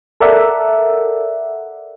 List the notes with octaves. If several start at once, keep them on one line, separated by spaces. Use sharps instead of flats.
A4 A#4 D5 E5 F#5